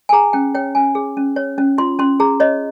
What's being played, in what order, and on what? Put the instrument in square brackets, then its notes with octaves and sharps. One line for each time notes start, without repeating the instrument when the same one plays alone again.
[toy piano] G#5
G#4 A#5
C#4 G5
C#5 G5
C#4 G#5
G#4
C#4
C#5
C#4
F4 C6
C#4 C6
G#4 A#5
C#5 D#5